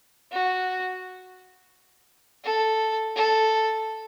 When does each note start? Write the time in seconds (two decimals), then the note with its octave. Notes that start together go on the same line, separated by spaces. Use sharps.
0.32 F#4
2.44 A4
3.16 A4